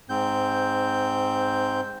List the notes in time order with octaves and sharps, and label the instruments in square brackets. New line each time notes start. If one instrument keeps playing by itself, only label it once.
[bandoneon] G#2 C4 G6